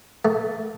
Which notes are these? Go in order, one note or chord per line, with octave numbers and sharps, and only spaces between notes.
A3